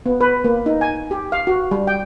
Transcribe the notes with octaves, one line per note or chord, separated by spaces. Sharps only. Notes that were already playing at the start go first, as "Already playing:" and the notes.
B3
B4
A#3
D#4
G#5
G4
F5
F#4
G3
G5